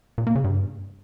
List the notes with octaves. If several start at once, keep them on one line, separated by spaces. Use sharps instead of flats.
A#2
A#3
C#3
G2